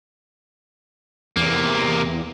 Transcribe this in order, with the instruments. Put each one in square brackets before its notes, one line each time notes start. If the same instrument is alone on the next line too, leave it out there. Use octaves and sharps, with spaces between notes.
[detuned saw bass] E2 [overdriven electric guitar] C3 A#3